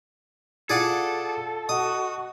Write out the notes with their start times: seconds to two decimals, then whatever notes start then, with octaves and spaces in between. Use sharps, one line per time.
0.70 E4 F4 G#4 A4 D5 F#5
1.69 F#4 D#5 F#5 D#6